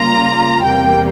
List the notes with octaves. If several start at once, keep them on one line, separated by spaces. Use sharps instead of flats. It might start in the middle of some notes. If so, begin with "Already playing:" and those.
Already playing: C#3 G3 A#3 F4 A#5
E2 C3 G3 A#3 G5